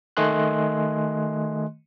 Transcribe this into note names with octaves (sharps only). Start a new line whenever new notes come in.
D#3 A3 D#5 G#5 C6 F#6